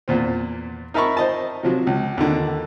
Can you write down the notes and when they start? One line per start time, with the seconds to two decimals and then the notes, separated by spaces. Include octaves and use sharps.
0.08 E2 A#2 C4
0.94 D#4 A#4 E5 A5 B5 C#6
1.17 C5 D#5 A5
1.63 C3 F3 F#3
1.87 C#2
2.18 D#2 D3